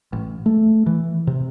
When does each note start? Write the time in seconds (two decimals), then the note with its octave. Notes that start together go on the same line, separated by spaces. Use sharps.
0.13 A1
0.46 A3
0.86 E3
1.27 C3